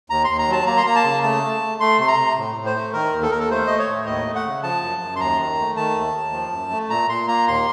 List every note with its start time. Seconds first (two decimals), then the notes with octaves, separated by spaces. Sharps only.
0.10 D#2 A#5
0.24 C6
0.29 D#2
0.38 A#5
0.48 F#3 A5
0.67 A#3 A#5
0.77 C6
0.86 A#3 A#5
0.96 A5
1.05 C#3
1.23 A3 A5
1.43 A3
1.62 A3
1.80 A3 C6
1.98 C3 C6
2.08 A#5
2.18 C3
2.37 A2
2.56 A2
2.66 C5
2.75 A3
2.93 D#3 A#4
3.13 D#2
3.22 A4
3.31 D#2 A#4
3.40 A4
3.50 A3 C5
3.67 A3 D#5
3.79 C#5
3.88 A2
4.06 D#2 D#5
4.25 A3
4.35 F#5
4.45 C#3
4.63 F3 A5
4.82 F#2
5.01 F#2
5.16 C6
5.20 D#2 A#5
5.39 D#3
5.58 A3
5.77 D#3 A5
5.96 D#2
6.15 D#2
6.33 F3
6.52 F#2
6.71 A3
6.90 A#2 A#5
7.09 A#2 C6
7.27 A#3 A#5
7.47 D#2 C6